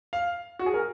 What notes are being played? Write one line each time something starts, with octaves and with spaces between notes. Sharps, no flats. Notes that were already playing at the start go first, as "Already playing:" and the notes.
F5
F#4
G#4
A#4